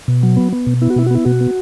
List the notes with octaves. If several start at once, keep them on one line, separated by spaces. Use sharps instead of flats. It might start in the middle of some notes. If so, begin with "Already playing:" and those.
B2
F#3
B3
B3
B2
B3 E4
F#4
B2 E4
F#4
B3 E4
B2 F#4
B3